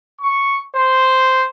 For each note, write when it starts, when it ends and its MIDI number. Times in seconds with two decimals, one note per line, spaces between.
0.21 0.61 85
0.76 1.47 72